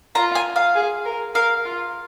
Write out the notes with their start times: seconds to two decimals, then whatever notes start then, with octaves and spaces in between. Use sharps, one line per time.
0.15 F4 A#5
0.35 G#5
0.56 F5
0.75 G#4
1.05 A#4
1.35 A#4 F5
1.65 F4